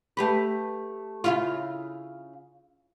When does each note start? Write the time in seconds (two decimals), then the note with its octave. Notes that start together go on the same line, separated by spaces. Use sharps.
0.17 A3 G4 B4
1.24 C#3 E4 F4